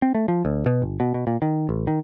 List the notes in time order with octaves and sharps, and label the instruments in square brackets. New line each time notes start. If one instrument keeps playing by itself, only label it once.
[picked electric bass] C4
A3
F3
D2
B2
G1
B2
B2
A#2
D#3
A1
D#3